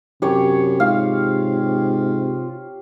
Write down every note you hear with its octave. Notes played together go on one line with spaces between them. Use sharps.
F#2 C3 G4 C#5
G#2 F4 F5